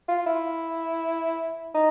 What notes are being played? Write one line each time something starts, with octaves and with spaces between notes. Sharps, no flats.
F4
E4
D#4